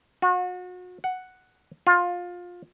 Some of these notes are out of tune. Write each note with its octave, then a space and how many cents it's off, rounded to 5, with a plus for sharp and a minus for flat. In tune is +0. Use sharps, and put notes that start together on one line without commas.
F#4 -35
F#5 +0
F4 +20